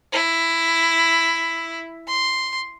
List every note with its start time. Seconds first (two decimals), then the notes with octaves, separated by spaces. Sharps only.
0.12 E4
2.07 C6